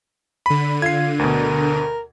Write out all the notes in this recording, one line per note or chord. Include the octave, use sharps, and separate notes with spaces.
D3 B5 D#7
F4 G#6 C7
D2 B2 A#4